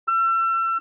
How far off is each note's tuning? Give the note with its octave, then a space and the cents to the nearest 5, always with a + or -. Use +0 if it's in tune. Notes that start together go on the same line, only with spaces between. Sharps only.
E6 +35